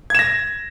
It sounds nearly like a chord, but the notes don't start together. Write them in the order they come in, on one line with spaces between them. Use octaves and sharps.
G#6 E7 A#6